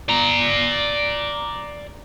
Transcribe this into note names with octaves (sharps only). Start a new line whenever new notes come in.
D5 A#5